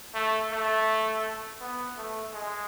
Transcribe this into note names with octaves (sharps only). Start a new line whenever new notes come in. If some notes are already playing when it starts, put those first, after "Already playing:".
A3
A3
B3
A3
G#3